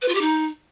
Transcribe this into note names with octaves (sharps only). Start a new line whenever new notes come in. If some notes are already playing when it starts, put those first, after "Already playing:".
B4
F4
G4
D#4